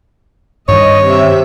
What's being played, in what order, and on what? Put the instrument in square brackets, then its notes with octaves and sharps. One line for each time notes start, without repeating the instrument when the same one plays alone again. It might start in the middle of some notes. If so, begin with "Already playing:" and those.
[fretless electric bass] G2 D#3 [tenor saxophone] C#5 [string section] D#5
[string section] C3 E5